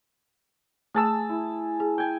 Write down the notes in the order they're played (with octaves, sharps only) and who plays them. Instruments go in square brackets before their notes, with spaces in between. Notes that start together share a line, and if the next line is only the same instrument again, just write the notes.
[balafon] A3 [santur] G#4 A5 E6
[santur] E4
[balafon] G#4
[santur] G5 G#5